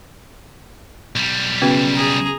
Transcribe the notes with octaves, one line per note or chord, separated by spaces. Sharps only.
B1 G3
C#3 B3 F#4 B4
G#4 A#5